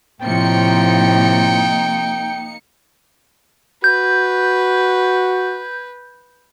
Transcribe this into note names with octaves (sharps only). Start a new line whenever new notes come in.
A2 C3 F3 A#3 D#4 G5 C#7
F#4 B4 G6